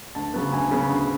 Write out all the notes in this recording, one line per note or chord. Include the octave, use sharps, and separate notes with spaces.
D2 A5
C#3 F#3 B3
D2 G#5
C#3 F#3 B3
D2